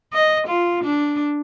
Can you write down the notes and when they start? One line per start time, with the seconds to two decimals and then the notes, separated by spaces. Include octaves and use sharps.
0.13 D#5
0.48 F4
0.84 D4